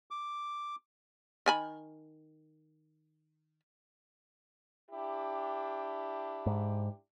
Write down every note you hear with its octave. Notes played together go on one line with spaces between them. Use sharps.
D6
D#3 G#5 B5
D4 E4 G4
G#2